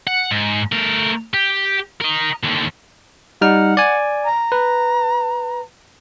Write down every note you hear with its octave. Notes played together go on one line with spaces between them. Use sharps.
F#5
G#2
A3 A#4
G4
A#4 D#5
D#2 D3
G3 D#4 F#5 F6
D5 G#5
A#5
B4